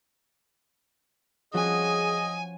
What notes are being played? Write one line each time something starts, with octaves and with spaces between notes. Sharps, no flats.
F3 C#4 F#4 G#4 D#5 G#5